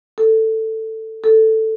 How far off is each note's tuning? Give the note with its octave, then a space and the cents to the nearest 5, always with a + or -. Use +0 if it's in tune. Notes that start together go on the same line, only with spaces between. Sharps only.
A4 +10
A4 +5